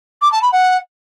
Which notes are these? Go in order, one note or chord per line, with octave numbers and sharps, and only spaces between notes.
D6
A5
B5
F#5